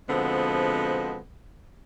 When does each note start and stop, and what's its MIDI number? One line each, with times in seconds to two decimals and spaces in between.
0.09 1.19 47
0.09 1.19 50
0.09 1.19 53
0.09 1.19 56
0.09 1.19 59
0.09 1.19 60